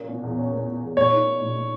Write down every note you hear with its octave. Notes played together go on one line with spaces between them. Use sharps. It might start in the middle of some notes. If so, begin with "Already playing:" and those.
Already playing: A#2 A#3 C#4
B2
E2
C#4
A#3
B2
E2
A#2 C#5
D#4
A#3
A#2
A#2